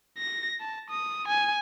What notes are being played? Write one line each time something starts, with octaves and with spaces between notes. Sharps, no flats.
A#6
A5
D#6
G#5